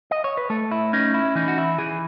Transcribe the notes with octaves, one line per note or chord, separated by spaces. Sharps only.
D#5
C#5
B4
A3 A4
E4
C#4 D#4
E4
E3 D#4
F#4
E4
E3 G#4